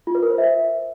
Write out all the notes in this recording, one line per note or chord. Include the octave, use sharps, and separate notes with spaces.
F4
B4
A#4
C5
E5